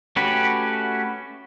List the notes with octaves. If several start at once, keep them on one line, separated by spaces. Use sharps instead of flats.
A3 C#4 F#4 G4 B4